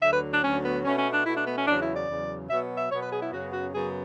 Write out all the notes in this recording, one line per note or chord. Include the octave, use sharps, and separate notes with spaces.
D2 D3 F#3 E5
B4
D4
D2 D3 F#3 C#4
B3
B2 A3 C#4
C#4
D4
B2 A3 E4
D4
B3
C#4
E2 C#3 F#3 D4
E4
D5
E2 C#3 F#3
B2 F#3 B3 E5
E5
B2 F#3 B3 C#5
B4
G#4
E4
F#2 C#3 F#3 B3 F#4
F#4
F#2 C#3 F#3 B3 G#4